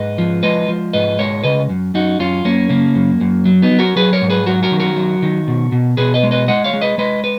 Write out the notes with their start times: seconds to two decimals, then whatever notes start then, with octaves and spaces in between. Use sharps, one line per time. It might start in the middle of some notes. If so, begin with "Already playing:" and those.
Already playing: G#2 B4 D#5
0.18 F3
0.43 G#3 B4 D#5
0.68 F3
0.93 G#2 B4 D#5
1.19 G#3 A#4 C#5
1.43 C#3 B4 D#5
1.69 F#2
1.94 F#2 D#4 F#4
2.19 F#2 C#4 F4
2.45 F#2 A#3 C#4
2.69 C#3 A#3
2.95 F#2
3.21 F#2
3.45 F#3
3.62 B3 D#4
3.71 F#3
3.79 F#4 A#4
3.96 F#3 G#4 B4
4.13 A#4 C#5
4.22 G#2
4.30 G#4 B4
4.46 F#3 F#4 A#4
4.63 F#4 A#4
4.72 D#3
4.80 F#4 A#4
4.97 F#3
5.23 D#3
5.48 B2
5.72 B2
5.97 B2 G#4 B4
6.14 B4 D#5
6.23 G#3
6.31 B4 D#5
6.48 G#3 D#5 F#5
6.64 C#5 F5
6.73 G#3
6.81 B4 D#5
6.98 G#3 B4 D#5
7.24 B4